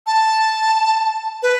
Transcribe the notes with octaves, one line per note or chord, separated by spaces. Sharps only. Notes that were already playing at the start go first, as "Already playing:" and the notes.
A5
B4